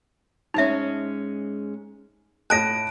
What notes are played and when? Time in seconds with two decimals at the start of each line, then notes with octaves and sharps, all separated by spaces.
0.54 G#2 G#3 C#4 D#4 E5
2.50 A2 A5 F#6 A#6 D7